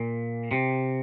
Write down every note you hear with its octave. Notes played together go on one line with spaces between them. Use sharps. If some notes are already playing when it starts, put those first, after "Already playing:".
Already playing: A#2
C3